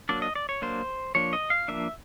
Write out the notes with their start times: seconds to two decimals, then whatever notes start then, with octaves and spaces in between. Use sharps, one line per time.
0.09 F#3 A#3 D4 D5
0.22 D#5
0.35 D5
0.49 C#5
0.62 F#3 A#3 D4 C5
1.15 F3 A#3 D4 C#5
1.33 D#5
1.50 F5
1.68 F3 A#3 D4 E5